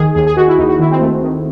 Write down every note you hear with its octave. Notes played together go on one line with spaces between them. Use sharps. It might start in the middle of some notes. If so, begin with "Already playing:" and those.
Already playing: D#2 D#3 G#4
D#2 G#4
G#4
D#3 F#4
E4
D#2 D#4
F#4
D#3 E4
C4
D#2 A3
D#3